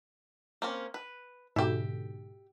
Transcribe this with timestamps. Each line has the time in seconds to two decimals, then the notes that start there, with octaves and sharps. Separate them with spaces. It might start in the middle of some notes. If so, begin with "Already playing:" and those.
0.62 A#3 C4 C#4
0.94 B4
1.56 G#2 B2 D3 G4 E5